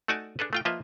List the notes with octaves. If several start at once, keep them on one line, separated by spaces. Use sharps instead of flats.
A3 D#4 F#4 D5 G#5 A5
D4 G#4 A4 B4
A3 F4 G5
F3 A#3 F4 B4 D#5 E5